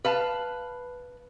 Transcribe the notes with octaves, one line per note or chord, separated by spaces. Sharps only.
B4 F5 A5